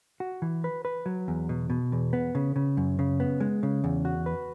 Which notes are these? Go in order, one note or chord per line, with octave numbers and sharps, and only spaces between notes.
F#4
E3
B4
B4
F#3
E2
B2
B2
E2
B3
C#3
C#3
F#2
C#3
B3
G#3
C#3
E2
F#4
B4